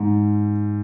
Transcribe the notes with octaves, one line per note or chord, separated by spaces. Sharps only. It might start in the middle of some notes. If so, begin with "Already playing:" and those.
Already playing: G#2